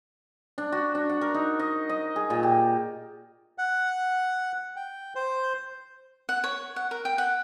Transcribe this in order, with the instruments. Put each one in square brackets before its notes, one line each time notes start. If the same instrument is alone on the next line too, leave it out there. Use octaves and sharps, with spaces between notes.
[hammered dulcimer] D4
F#4
D4
F#5
A#4
D#4
D#5
D#5
G#4
A#2
G4
[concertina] F#5
G5
C5
[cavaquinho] F#5
C#5
F#5
A#4
G5
F#5